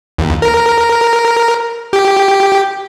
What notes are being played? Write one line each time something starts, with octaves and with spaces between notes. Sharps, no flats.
D#2
A#4
G4